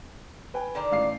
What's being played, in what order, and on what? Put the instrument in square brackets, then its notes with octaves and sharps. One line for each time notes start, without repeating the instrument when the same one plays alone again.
[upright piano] B4 G5 G#5
[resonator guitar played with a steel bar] D3 D#3 D4
[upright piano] A1 F5 C7